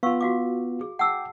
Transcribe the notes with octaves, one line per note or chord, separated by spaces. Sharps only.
B3 F4 F5 C#6 E6
F#4 F5 D6
G#4
F#5 G5 A5 D6 E6